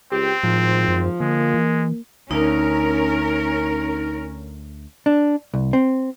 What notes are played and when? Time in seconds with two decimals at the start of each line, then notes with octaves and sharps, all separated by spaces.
0.12 C#2 C4 G4
0.43 G#1 A2 F3
0.88 F#2
1.20 D3 G#3 A#3
1.54 E3
2.31 D2 C#4 D#4 A#4
5.06 D4
5.54 C2
5.73 C4